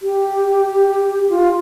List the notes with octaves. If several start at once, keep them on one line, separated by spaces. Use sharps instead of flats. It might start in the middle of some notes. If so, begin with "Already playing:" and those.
G4
F4